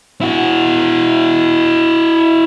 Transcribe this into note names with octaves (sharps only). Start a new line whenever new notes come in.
E4 F#4